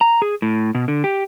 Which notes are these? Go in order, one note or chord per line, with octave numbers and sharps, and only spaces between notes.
A#5
G#4
A2
B2
D3
G4